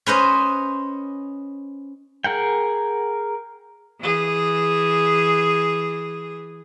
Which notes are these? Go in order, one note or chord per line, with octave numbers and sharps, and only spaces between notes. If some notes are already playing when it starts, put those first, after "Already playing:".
C#4 B4 C5 D#5
G#4 A#4 F#5 G5
E3 G#4